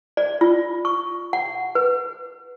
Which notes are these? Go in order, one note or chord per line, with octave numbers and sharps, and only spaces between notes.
D5
F4
C#6
F#5
B4